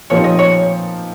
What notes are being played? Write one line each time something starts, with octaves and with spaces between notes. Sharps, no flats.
A#2 F3 C4 D#4 G4 C#5
D#5
C#5